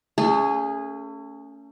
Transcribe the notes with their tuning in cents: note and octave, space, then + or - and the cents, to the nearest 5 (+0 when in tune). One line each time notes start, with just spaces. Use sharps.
A3 +35 C#4 +20 G#4 -10